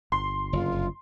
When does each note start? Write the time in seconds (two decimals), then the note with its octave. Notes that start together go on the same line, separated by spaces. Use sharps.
0.12 G1 C6
0.53 F#1 F4